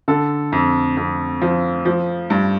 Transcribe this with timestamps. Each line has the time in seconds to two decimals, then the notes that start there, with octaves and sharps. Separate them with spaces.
0.08 D3 A4
0.52 F2
0.97 F2
1.42 F3
1.85 F3
2.30 G2